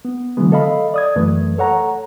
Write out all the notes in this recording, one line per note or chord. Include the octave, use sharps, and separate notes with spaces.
B3
D3 E3 F#3 G#3 B3
A4 D#5 F5 B5
D5 D#6 G#6
F#2 E3 A3 B4
A4 C#5 F#5 A#5